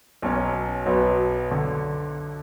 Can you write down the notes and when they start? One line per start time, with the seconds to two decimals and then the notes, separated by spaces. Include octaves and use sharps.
0.22 B1 B2 F#3 C#4
0.86 B1 B2 F#3 B3
1.51 D3